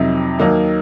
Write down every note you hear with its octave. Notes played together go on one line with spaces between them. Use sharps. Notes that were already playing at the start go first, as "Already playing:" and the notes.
Already playing: F2 C3 F#3 C4 D#4
D#2 D#3 F#3 A#3 D#4